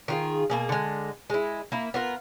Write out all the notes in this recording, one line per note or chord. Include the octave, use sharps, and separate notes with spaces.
D#3 F4 G#4
B2 A#3 G#4
D3 G#3
G#3 E4
A#3 E4
B3 F4 A#4